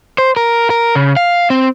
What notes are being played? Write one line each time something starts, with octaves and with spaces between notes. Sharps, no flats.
C5
A#4
A#4
C#3
F5
C4